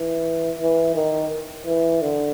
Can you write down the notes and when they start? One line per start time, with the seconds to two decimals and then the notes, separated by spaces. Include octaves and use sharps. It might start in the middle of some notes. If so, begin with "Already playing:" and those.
Already playing: E3
0.59 E3
0.94 D#3
1.66 E3
2.01 D3